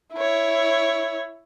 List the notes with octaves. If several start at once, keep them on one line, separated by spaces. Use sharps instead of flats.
E4 C#5